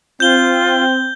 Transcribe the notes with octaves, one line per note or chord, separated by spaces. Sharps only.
C4 F4 G6 G7